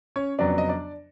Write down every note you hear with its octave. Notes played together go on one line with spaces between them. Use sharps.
C#4 C#5
F2 C#3 F#3 B3 D4 D5
D#5
D4 D5